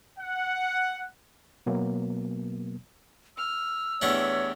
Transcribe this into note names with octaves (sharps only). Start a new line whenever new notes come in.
F#5
B2 F#3 A#3 B3
E6 F6
E2 E3 A3 D4 G4 C#5